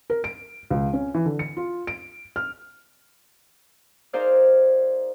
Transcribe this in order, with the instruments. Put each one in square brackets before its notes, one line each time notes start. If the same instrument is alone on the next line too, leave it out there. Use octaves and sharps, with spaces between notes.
[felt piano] A#4
D7
C#2
C#4
E3
D3
C#7
F4
D7
F6
[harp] D#4 G#4 A#4 C5 D5 F5